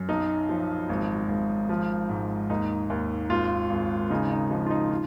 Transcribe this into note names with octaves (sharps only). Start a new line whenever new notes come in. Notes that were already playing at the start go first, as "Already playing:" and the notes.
Already playing: F#2
B1 D#4
F3
G#1
G#1
F3
G#2
D#2 D#4
D#2
G#1 F4
G#1
C#3 D#4
D#4
F3 D#4
F4
D#4
F4